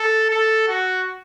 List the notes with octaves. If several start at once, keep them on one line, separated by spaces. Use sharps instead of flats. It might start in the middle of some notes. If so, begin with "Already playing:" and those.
Already playing: A4
A4
F#4